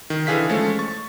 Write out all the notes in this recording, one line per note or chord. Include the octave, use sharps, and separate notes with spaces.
D#3
D3 E3 G#4 F5 B6
F3 G#3 A3 C#4
C#6 A6